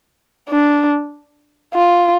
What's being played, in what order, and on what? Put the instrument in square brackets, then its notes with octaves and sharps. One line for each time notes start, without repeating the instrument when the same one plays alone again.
[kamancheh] D4
F4